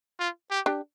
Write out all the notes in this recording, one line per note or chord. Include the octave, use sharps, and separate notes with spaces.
F4
G4
D4 G4